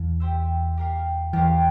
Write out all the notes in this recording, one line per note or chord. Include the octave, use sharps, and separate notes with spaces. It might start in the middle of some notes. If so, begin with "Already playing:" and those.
Already playing: E2 E3
G4 C5 E5
G4 A#4 F5
E2 E3 G4 A#4 F5